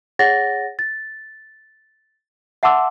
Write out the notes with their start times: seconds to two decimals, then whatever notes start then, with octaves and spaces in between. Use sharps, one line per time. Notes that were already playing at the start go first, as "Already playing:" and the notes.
0.19 G#4 C#5 F#5 A6 A#6
0.79 A6
2.63 E5 F#5 A5 C6 D6 E6